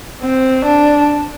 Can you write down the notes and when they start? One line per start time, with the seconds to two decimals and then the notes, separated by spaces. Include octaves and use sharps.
0.22 C4
0.65 D4